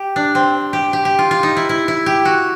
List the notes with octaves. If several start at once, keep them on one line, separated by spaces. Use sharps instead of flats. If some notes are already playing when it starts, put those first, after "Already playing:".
Already playing: G4
D4
C4
G4
G4
G4
F4
F4
D#4
E4
E4
E4
G4
F#4